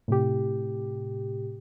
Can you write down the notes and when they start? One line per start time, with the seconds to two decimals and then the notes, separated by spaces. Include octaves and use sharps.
0.08 A2 C3 G4